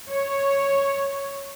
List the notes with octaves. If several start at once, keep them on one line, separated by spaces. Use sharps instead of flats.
C#5